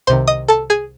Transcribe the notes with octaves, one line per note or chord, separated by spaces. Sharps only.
C2 C3 D#3 C5 C6
D#5 D#6
A4 A5
G#4 G#5